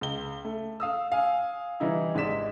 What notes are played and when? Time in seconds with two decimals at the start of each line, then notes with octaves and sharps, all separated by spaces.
0.01 C#2 G7
0.45 A3
0.80 F5 D#6 E6
1.12 F5 G#5
1.80 E3 G3 D#4 E4
2.14 G#1 G#3 D5 B6 E7